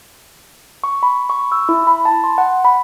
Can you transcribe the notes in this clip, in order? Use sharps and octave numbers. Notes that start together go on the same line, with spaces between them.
C#6
B5
C#6
E6
E4
B5
A5
C6
F#5
B5